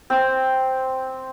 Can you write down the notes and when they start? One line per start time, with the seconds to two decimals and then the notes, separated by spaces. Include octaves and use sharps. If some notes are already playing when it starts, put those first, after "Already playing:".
0.10 C4